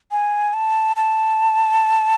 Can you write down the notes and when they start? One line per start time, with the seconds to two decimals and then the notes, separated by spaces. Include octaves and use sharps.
0.11 G#5
0.53 A5
0.96 A5